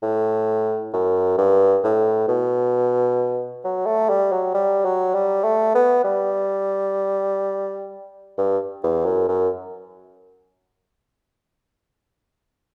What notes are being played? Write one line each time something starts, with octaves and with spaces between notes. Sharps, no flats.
A2
F#2
G2
A2
B2
F#3
A3
G3
F#3
G3
F#3
G3
A3
B3
G3
G2
E2
F#2
F#2